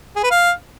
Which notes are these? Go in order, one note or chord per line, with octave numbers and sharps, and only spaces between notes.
G#4
B4
F5